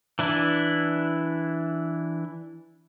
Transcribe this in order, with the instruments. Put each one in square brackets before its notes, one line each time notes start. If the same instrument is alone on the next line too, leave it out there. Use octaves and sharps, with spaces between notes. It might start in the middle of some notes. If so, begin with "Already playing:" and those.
[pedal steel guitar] E3 D4 E4